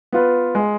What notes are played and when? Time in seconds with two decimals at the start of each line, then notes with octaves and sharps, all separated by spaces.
0.12 B3 F4 B4
0.55 G#3